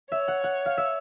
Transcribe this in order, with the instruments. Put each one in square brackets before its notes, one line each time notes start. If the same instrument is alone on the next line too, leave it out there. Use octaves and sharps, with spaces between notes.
[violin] C#5 [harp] E5
[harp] F#5
F#5
F5
E5